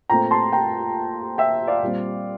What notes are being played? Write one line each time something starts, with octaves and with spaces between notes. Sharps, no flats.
A#2 A3 C4 G5 A#5
A5 C6
G5 A#5
E5 G5
D5 F5
A#2 G3 C4